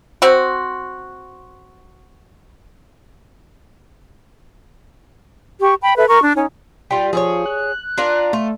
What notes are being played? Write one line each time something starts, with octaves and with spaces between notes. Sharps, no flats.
C4 F#4
G4 C#6
G5 B5
A4 B4 E5
A#4 C#6
D4
C#4 D#4
G3 F4 G5
F3 G#4 A4 C#5
F#6
D4 F4 A#4
A3 F4